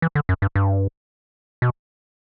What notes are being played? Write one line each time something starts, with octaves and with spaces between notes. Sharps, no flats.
E3
D3
F#2
G2
G2
B2